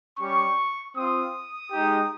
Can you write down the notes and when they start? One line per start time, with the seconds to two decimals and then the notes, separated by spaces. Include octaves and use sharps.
0.18 G3 C#4 G4 C#6
0.95 C4 F4 D#6
1.72 G#3 D#4 G4